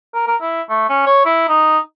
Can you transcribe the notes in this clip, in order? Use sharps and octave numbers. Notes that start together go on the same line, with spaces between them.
A#4
A#4
E4
A3
C#4
C#5
E4
D#4